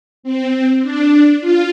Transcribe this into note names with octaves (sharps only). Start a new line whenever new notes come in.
C4
D4
F4